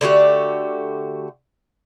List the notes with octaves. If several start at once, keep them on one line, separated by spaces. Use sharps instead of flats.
D3 A3 F#4 G4